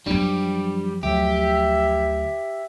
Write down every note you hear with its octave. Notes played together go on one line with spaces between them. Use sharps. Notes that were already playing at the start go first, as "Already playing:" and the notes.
F#2 F3 G3 D4
D2 F#3 G4 E5